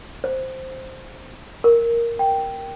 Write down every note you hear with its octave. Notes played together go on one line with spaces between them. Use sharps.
C5
A#4
G5